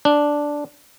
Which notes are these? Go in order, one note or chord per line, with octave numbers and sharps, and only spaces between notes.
D4